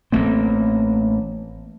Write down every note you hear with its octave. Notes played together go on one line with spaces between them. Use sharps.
A1 A3 A#3 C4